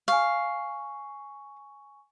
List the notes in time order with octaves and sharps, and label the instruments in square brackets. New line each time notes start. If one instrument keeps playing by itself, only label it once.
[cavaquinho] F5 [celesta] G#5 C#6